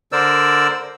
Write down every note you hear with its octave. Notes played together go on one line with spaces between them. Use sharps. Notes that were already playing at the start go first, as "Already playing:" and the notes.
D3 A#4 C5 D5 E6